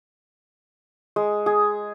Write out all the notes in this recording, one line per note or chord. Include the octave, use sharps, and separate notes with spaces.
G#3
G#4